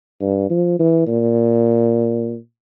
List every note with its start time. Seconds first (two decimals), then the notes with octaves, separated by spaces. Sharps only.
0.21 G2
0.50 F3
0.79 E3
1.07 A#2